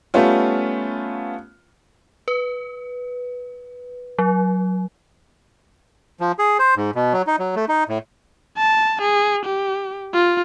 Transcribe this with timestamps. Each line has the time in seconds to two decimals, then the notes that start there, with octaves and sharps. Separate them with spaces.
0.14 G3 A3 B3 C#4 F4
2.28 B4
4.19 F#3
6.20 F3
6.39 G#4
6.59 C5
6.77 G#2
6.95 B2
7.13 F#3
7.27 D#4
7.39 F#3
7.56 A3
7.69 D#4
7.89 A2
8.58 A5
9.02 G#4
9.45 G4
10.14 F4